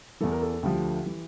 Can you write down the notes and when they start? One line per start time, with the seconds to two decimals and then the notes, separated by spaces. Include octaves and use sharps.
0.20 E2 E3 A4
0.31 A#4
0.42 A4
0.52 A4
0.63 D2 D3 F3 G4
1.06 E3